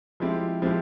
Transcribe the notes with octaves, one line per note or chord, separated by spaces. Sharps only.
F3 G#3 C4 E4 G4
F3 G#3 C4 E4 G4